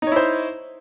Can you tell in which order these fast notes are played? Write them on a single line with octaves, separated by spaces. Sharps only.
D#4 C#5 E4 C5